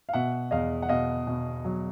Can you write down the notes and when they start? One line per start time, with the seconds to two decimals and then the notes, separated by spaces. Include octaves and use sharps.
0.09 F5
0.13 B2 E5 F#5
0.51 E2 D#5 F5
0.82 F#5
0.89 B2 D#5 F5
1.27 B2
1.65 F#3